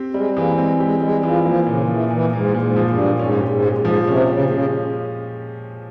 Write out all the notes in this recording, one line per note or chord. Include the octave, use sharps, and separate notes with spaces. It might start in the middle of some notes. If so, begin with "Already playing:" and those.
Already playing: C4 G4
G3 G#3
E3 A#3
G#3 C4
G#3 G4
G3 G#3
E3 F3
F3 A#3
A#2 C#3
E3 F3
A#2 E3
G#2 A#3
A#2
G#2
F3
G2
A#2
G#2 C#4
G4
G#2
G#3
G#2
F3
C3 C#4
C#3 G4
C#3 G#3